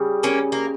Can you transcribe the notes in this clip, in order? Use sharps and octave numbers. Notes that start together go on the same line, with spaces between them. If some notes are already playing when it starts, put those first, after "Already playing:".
Already playing: C#3 G3
A#3 C#4
A#3